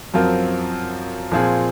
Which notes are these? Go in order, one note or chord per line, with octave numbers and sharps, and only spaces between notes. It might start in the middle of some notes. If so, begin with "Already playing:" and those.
F#2 F3 C4 F4 A#4
A#2 F3 C4 F4 G#4